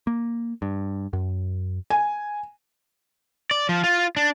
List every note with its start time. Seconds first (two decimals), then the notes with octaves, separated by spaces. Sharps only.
0.07 A#3
0.62 G2
1.13 F#2
1.90 G#5
3.51 D5
3.69 F3
3.84 F4
4.17 D4